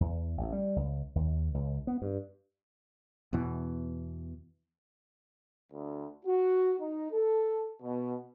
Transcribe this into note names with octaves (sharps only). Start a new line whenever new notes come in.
E2
A1
G3
C#2
D#2
C#2
B3
G2
E2 B2 E3
D2
F#4
D#4
A4
B2